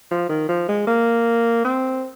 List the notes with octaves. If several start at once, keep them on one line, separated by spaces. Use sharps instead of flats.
F3
D#3
F3
G#3
A#3
C4